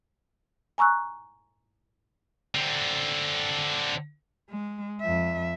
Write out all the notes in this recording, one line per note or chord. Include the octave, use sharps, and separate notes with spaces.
G#5 A#5 C#6 E6 F#6
D3 C4
G#3
F2 E5